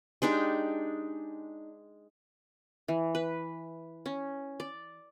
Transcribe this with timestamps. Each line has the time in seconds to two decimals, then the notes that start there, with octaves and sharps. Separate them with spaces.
0.22 G#3 D4 D#4 G4
2.88 E3
3.15 B4
4.06 C#4
4.60 D5